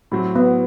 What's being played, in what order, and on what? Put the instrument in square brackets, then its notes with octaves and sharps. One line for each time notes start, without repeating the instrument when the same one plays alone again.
[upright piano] A2 F#3 C4
[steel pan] B3